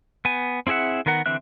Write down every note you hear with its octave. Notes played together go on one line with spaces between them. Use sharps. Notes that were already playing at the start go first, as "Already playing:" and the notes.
B3 G#5
C4 E4 G#4 E5 F#5
D#3 B3 A#4 F#5
D3 E3 C4 E5 F#6